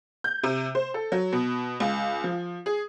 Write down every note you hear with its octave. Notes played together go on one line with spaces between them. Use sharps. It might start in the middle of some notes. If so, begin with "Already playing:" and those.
G6
C3
C5
A4
F#3
B2
C#2
F3
G#4